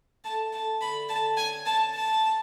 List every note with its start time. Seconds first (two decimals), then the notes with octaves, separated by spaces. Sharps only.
0.24 A3 A5
0.53 A3 A5
0.81 D3 B5
1.09 D3 A5
1.37 C#4 G#5
1.66 C#4 A5
1.94 B4 A5
2.23 B4